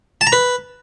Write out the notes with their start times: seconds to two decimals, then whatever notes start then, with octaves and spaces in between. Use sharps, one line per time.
0.21 A5
0.27 A#5
0.32 B4